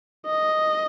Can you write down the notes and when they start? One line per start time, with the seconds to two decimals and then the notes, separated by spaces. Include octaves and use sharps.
0.26 D#5